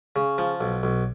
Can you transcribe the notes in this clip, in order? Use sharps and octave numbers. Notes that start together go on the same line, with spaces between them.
C#3
F3
B1
B1